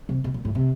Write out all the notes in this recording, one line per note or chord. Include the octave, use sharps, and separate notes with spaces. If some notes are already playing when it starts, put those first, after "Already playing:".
C3
B2
A#2
A2
C3